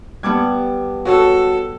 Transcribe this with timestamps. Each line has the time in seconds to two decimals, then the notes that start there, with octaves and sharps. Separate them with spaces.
0.23 G3 B3 A5 D6 G#6
1.05 F#4 A4 C#5